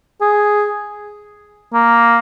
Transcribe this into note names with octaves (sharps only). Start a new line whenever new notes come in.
G#4
A#3